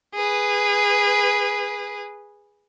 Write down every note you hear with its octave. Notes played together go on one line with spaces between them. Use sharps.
G#4 B4